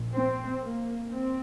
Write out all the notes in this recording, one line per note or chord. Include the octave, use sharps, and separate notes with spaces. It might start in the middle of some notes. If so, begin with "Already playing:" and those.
Already playing: A#1 A#2
C4
A#3
C4